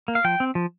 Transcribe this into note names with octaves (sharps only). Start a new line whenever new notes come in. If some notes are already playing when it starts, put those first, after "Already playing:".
A#3
F5
F3 G5
C4
F3